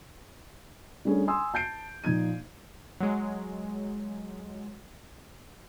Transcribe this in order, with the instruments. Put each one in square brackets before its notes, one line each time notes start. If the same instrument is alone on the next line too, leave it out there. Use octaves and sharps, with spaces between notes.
[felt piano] G3 A3 C#4 D4 G#4
G#5 C6 D#6 E6
A5 G6 C7 D7
A#2 F3 D#4 G#6 D#7
[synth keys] F#3 G#3